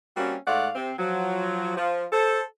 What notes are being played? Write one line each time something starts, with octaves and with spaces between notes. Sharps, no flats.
G3 A#3 C4 C#4 F#4
G#2 A3 D5 F5 F#5
C3 C4
F3 F#3
F3
A4 C5